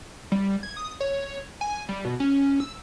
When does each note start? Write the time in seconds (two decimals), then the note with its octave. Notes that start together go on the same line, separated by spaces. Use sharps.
0.32 G3
0.63 G#6
0.77 D#6
1.00 C#5
1.61 G#5
1.89 G3
2.05 B2
2.20 C#4
2.60 E6